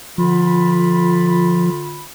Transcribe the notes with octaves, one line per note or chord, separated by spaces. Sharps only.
D3 F3 F4 B5